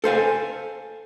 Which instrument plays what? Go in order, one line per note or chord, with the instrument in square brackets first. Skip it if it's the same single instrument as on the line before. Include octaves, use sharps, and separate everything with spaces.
[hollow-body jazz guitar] A4 C5 F5 G#5